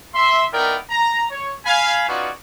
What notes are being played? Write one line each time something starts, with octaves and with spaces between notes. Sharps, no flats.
E5 C6
B3 D#4 E4 A#4 D5 G5
A#5
C#5
F5 G#5 B5
C#4 D#4 F4 F#4 B4 D5